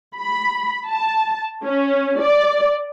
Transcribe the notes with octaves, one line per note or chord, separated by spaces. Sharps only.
B5
A5
C#4
D5